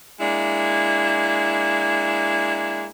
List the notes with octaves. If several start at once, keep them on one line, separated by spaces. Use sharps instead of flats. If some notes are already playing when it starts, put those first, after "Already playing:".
G#3 A#3 D4 E4